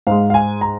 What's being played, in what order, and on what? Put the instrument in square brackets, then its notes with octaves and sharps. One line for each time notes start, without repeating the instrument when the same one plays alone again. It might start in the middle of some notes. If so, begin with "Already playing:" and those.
[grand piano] G#2 G#3 F5
F5
G#5
A#5